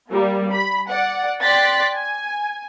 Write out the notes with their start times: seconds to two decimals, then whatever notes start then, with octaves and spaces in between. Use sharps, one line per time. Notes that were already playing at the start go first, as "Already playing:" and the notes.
0.10 G3 A#3
0.51 B5
0.89 D5 F#5
1.42 D5 G5 C6 F#6 A6 B6
1.95 G#5